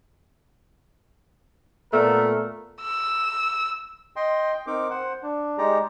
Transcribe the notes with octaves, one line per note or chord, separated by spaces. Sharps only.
A#2 A3 B3 A#4
E6
D#5 G5 C6
G5
C4 D#4 A#4 D6
C5 F#5
D4
G#3 D#4 G4 D5 A#5